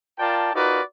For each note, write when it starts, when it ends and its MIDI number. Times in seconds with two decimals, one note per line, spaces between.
0.19 0.51 65
0.19 0.51 70
0.19 0.51 74
0.19 0.51 79
0.19 0.51 81
0.54 0.81 63
0.54 0.81 65
0.54 0.81 66
0.54 0.81 70
0.54 0.81 71
0.54 0.81 74